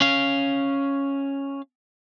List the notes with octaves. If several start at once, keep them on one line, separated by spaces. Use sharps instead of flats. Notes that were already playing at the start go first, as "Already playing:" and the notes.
C#4 F5